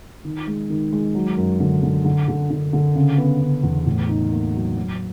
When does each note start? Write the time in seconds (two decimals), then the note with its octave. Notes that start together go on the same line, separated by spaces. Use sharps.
0.25 D#3
0.47 G#3
0.70 D#3
0.92 G#3
1.15 F#3
1.37 F#2
1.60 D3
1.83 D3
2.05 D3
2.28 D3
2.51 D3
2.73 D3
2.95 C#3
3.18 B3
3.41 C#3
3.63 E2
3.86 A2
4.09 D#4
4.32 A#3
4.54 F#3
4.77 F#3